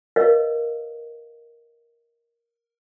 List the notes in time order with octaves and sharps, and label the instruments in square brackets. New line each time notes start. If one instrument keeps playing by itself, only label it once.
[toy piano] A#4 B4 C#5 D#5 F5